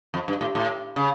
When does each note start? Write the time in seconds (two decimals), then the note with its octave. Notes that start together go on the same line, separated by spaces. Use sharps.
0.14 F2
0.28 G2
0.41 A2
0.55 A2
0.96 C#3